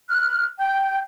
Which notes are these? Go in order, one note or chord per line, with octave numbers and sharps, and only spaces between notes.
F6 F#6
G5 G6